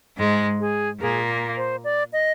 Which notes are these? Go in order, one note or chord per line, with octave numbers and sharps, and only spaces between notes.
G#2 G#3
G#4
A#2 A#3 G#4
C5
D5
D#5